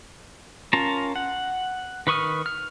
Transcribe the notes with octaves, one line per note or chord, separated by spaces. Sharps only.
C#4 F4 A#4 A5 A#5
F#5
D#3 B4 C#6 D#6 F6
F6